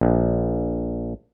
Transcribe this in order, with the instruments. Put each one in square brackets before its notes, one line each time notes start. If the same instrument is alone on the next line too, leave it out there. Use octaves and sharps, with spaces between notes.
[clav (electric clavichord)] A#1